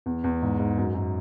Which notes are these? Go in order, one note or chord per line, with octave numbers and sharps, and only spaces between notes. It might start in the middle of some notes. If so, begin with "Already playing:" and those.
E2
E2
G#2
G#2
F#2
F#2